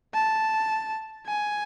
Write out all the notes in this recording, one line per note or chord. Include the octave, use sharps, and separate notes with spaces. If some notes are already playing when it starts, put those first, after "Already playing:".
A5
G#5